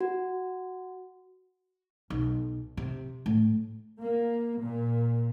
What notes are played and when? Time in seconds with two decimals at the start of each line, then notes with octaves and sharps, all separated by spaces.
0.01 F#4
2.10 B1
2.77 C3
3.26 A2
4.00 A#3
4.61 A#2